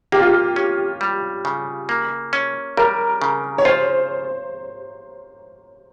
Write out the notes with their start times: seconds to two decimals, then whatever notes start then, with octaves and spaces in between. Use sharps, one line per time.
0.12 A#3 G4
0.20 F4
0.27 G4
0.56 C#4
1.01 G3
1.45 C#3
1.89 A#3
2.33 C#4
2.77 G3 A#4
3.22 C#3
3.58 C#5
3.65 F4 C5